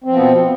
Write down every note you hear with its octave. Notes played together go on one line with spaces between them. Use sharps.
B2 F3 B3 C4